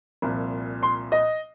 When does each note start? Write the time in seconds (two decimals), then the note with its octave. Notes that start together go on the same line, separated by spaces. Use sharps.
0.22 C2 A#2 F3
0.83 C6
1.12 D#5